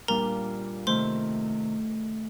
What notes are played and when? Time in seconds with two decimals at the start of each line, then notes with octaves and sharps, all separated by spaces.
0.08 A#2 G3 D4 F4 A#4 A#5
0.86 C3 D#3 A3 C5 C6